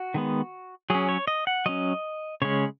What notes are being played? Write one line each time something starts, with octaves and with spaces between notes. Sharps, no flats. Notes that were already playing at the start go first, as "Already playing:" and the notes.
Already playing: F#4
D#3 G#3 B3
F#3 C#4 G#4
C#5
D#5
F#5
F#3 C#4 D#5
C#3 G#3 C#4 C#5